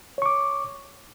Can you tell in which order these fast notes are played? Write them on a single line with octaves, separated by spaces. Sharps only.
C#5 C#6 D6